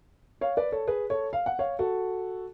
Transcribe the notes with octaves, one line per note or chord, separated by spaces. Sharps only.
C#5 F5
B4 D5
A4 C#5
G#4 B4
A4 C#5
F5
F#5
C#5 F5
F#4 A4